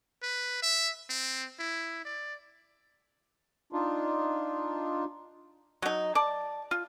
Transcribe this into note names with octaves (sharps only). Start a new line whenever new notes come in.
B4
E5
C4
E4
D5
D4 D#4 F4
F#3 D#4
D5 A5
F4